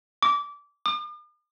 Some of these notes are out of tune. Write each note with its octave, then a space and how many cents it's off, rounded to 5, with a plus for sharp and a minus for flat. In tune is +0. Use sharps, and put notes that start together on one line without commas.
D6 -20
D6 +45